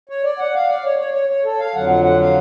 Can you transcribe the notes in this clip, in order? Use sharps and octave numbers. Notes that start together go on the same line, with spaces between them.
C#5
D5
F#5
F5
D5
C#5
C#5
C#5
C#5
A4
F5
F2 D3 F#3 F#5
F#5
F#5
F5